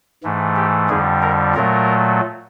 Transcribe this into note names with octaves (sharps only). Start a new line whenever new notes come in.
G#2 E3 A3
G4
F2 D3 G3 G#4
A#4
A#2 F#3 A3 A#4